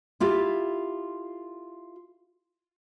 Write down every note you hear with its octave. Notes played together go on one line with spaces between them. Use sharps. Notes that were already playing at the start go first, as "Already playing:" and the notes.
E4 F4 G4 A4